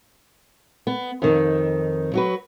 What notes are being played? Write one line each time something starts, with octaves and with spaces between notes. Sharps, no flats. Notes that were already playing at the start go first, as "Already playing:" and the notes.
B3
F2 D#3
F#3 F#4 B4